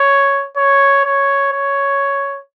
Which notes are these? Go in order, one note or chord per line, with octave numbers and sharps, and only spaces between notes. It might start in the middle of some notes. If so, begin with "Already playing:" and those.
Already playing: C#5
C#5
C#5
C#5